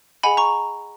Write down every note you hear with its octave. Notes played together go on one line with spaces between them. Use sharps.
G#4 D#5 F#5 G#5 B5
A#5 C#6